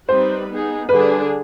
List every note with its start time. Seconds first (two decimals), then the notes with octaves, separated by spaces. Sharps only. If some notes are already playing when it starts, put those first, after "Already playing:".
0.09 G3 C4 D#4 B4 C5
0.49 B3 D#4 G#4
0.89 D3 G3 D4 G#4 B4